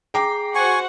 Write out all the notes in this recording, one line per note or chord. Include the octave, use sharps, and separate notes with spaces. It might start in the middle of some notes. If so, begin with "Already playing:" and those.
G#4 G5 A#5 D6 C7
F#4 C5 F#5 G#5 C#6